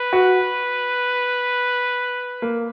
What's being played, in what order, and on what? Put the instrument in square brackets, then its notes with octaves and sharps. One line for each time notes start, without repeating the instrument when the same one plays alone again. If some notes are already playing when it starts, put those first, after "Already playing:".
Already playing: [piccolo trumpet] B4
[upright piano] F#4
A#3